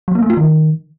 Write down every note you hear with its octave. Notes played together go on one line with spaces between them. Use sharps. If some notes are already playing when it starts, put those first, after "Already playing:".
F#3
A#3
A3
F4
D#3